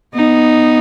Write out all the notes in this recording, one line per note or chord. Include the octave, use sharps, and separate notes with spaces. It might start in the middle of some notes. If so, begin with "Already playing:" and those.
B3 D#4